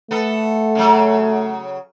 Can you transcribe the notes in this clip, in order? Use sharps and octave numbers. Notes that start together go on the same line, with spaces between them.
A3 B3 A4
C#3 F#3